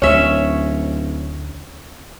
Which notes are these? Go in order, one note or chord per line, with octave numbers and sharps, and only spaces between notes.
D1 D2 C#4 C#5 E5